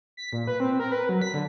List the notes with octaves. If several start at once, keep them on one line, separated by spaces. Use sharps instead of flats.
B6
A#2
B4
C4
A#4
B4
F#3
B6
D3